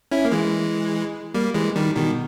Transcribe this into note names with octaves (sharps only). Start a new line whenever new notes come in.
C#4 E4
A#3
E3 G#3
G3 A#3
E3 G#3
D#3 G3
B2 D#3